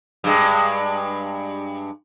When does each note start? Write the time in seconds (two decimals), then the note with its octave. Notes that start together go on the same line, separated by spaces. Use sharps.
0.24 G2 G#3